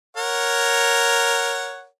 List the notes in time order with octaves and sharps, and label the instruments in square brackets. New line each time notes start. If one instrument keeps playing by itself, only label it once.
[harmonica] A#4 C#5 F#5